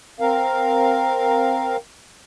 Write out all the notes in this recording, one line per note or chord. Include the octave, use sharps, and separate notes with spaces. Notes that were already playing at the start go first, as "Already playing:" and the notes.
C4 A#4 F5